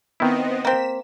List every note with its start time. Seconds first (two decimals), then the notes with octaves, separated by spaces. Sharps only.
0.20 D#3 B3 C4 E4 D#5
0.65 A#3 C4 B6 E7